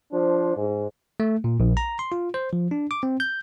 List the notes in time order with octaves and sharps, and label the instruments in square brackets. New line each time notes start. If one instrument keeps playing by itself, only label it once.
[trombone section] F3 D4 C5
G#2
[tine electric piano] A3
A#2
A#1
A#5
C6
F4
C5
F3
D4
D6
C4
G6